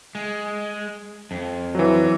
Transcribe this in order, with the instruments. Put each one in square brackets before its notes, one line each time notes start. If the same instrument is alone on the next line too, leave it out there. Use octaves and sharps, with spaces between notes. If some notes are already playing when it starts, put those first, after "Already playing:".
[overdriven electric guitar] G#3
F2
[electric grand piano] E3 F#3